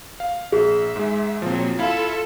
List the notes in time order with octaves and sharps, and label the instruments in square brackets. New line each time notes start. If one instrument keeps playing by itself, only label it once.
[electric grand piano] F5
[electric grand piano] A#1 [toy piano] G#4 [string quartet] E5
[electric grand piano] G#2 G#3
[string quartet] A#2 F#3 [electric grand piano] F3 C4
[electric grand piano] E4 F5 B5 [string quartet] F4 A4 E5